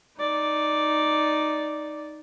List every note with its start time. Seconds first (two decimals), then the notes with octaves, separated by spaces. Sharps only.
0.19 D#4 D5